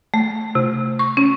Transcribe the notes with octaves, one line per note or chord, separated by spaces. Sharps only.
A3
C3
C#6
C#4